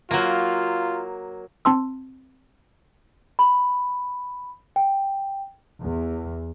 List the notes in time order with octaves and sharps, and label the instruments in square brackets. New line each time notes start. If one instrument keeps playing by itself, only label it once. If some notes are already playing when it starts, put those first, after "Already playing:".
[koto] F#3 A#3 [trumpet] F4
[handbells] C4 A5 C6 E6
[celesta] B5
G5
[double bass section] E2